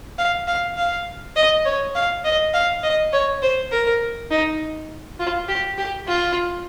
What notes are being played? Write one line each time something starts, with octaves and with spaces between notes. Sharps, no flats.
F5
F5
F5
D#5
C#5
F5
D#5
F5
D#5
C#5
C5
A#4
D#4
F4
G4
G4
F4